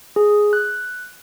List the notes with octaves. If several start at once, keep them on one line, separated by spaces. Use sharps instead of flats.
G#4
F#6